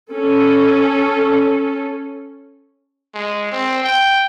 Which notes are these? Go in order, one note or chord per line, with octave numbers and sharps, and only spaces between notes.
C#4 A4
G#3
C4
G5